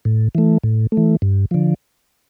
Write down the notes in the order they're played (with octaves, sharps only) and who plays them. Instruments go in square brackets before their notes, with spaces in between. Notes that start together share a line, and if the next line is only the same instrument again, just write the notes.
[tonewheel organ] A2
E3 A3
A2
A3
E3
G2
D3 F3